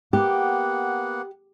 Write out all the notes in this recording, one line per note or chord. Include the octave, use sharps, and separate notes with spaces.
A#3 B3 G4 F#5